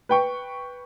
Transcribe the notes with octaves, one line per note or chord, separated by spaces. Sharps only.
B4 G5 C#6